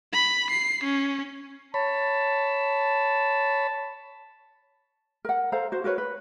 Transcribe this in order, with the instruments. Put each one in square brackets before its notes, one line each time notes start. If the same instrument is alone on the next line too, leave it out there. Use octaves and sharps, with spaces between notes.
[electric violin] B5
C7
C#4
[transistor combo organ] C#5 B5 [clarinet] A5
[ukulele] A#4 F#5
A4 C5 F5 A#5
F#4 C5
F#4 A#4 B4 C#5
B4